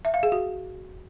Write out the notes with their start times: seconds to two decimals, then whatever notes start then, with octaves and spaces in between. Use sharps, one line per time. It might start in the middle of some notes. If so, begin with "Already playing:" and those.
0.05 E5
0.14 F5
0.23 G#4
0.32 F#4